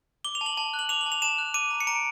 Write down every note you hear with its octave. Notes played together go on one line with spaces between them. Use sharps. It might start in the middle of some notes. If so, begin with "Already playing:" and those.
D6 G7
F7
A5
F#7
A5
F#6
F#7
D6 F7
F#7
A5
F7
A5 E7
F#6
D6 D#7
A#5
C#7
A#5 D7